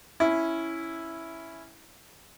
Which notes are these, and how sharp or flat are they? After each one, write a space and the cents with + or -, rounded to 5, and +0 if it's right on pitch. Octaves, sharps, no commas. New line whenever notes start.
C#4 +0 E4 +0